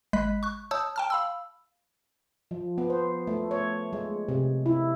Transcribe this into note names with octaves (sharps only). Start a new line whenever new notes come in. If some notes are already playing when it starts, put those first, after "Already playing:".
G#1 G#3 D#5 B5 F#6 B6
C#6 F#6
C#5 A5 D#6 E6 G6
G5 A5 F6
F5 B5 E6
F3
B3
C5
A3
C#5
G#3
C3
E4